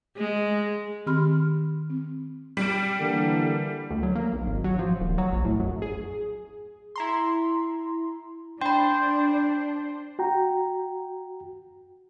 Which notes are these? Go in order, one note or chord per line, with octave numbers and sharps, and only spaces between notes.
G#3
D#3 C4 G4 B5 C6 F6
C4
G3 D7
D3 E3 A#3
D2
F#3
A#3
B1
G#1
F#3
F3
D#1
F#3
A#1
A2
F#2
G#4
E4 A#5 C6
D4 C5 G5 B5
F#4 G5 A#5